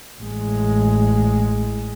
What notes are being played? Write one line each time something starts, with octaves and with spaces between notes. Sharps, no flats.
A1 G#3